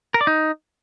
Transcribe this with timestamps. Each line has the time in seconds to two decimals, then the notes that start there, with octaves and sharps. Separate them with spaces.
0.14 A#4
0.21 D5
0.27 D#4